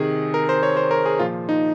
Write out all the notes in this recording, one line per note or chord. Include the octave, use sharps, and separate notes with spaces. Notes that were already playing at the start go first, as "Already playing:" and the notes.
Already playing: C3 D#3 G#4
A#4
C5
C#5
C5
A#4
G#4
A#2 F3 F4
D#4